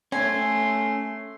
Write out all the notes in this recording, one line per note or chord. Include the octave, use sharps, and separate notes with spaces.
A3 C#4 G#5 C6